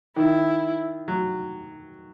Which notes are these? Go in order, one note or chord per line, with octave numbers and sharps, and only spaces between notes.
D#3 E4
F#3